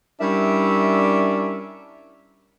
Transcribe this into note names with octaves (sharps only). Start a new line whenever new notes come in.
G3 C#4 D4 E4 A#4 E5